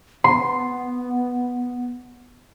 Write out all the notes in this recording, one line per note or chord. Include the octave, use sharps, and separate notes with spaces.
B3 C6